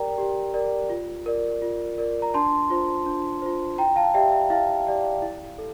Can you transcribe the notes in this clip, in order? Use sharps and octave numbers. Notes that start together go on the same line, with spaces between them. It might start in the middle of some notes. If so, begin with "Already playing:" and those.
Already playing: G4 A#4 D5 G5 A#5
G4
A#4 D5
F4
A#4 D5
F4
A#4 D5
A#5
D4 A5 C6
F4 C5
D4
F4 C5
E4 G5 A#5
F5 A5
G4 D5 E5 G5
E5
E4 F5
G4 D5
E4
A4